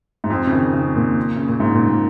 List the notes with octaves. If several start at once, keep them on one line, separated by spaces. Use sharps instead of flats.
G#2
F2
C#3
D#3
C#3
A#2
C#3
A#2
G#2
A#2
A#2